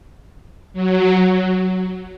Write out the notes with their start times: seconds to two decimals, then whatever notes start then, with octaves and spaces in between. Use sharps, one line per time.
0.73 F#3